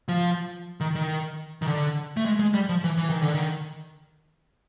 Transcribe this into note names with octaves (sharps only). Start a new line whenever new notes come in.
F3
D#3
D#3
D#3
D3
A3
G#3
G#3
G3
F3
E3
E3
D#3
D3
D#3